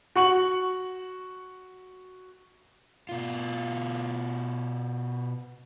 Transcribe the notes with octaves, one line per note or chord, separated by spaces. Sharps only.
F#4 C#6 F#7
B2 F4